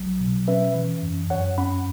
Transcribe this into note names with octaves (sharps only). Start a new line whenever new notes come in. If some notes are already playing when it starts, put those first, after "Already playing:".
Already playing: B1 F#3
B2
C#4 B4 E5
E3
F#2
F#2 C#5 F#5
C#4 F#5 B5